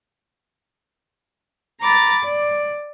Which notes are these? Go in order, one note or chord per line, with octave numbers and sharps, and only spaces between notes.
A#5 B5 D6 A6
D5